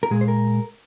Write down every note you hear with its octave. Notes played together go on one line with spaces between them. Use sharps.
A#4
A#2 G#3 G#4
C5
A#4